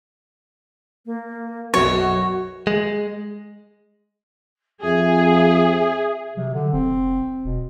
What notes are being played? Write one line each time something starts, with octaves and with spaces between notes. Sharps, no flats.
A#3
B1 F#2 B2 F#4 C#5
G#3
F2 G#4 E5
C3 F#3
D3
F1 C4
E1 B2